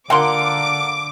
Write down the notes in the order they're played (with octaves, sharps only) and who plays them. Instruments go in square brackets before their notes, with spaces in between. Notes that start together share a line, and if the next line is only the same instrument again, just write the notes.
[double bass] D3 [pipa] A#3 F4 C6 [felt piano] A#4 F5 F#5 [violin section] D6